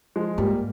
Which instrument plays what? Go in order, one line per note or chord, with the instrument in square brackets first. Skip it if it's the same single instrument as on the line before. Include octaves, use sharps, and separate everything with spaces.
[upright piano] F3 G#3
[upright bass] G#2 [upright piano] G3 A#3